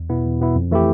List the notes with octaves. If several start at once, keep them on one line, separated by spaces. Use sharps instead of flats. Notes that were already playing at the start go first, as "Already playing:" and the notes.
Already playing: E2
B2 B3 E4
E2
B2 B3 E4
F2
E3 A3 E4 G4